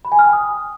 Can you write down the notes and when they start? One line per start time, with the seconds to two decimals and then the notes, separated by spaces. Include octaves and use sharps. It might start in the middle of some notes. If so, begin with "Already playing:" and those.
0.05 B5
0.12 G#5
0.19 F6
0.26 G5
0.33 D#6